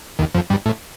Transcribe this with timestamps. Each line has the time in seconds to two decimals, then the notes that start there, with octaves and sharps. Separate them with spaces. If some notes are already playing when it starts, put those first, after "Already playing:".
0.19 D#2 D#3
0.35 F2 F3
0.50 G2 G3
0.66 A2 A3